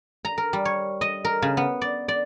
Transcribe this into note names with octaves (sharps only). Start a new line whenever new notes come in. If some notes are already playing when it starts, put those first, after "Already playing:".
A#5
A#4
G3
C#5
D#5
A#4
C#3
B3
D5
D5